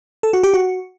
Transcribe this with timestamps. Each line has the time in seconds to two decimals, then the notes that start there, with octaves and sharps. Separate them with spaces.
0.23 A4
0.33 F#4
0.43 G4
0.54 F#4